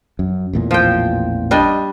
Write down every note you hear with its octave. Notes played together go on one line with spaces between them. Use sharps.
F#2
A1 E2 A#2
F3 G5
G3 D4 D#5